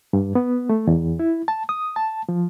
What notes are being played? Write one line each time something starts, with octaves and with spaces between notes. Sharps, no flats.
G2
B3
A3
E2
E4
A5
D#6
A5
F3